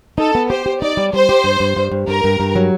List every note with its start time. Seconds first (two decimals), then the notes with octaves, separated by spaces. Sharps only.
0.18 D#4 A4
0.35 B3
0.50 G4 C5
0.66 G4
0.82 D#4 D5
0.97 G3
1.13 G3 C5
1.29 G4
1.44 G2
1.60 G2
1.77 G2
1.92 G2
2.08 G2 A#4
2.24 G2
2.40 G2
2.56 F#3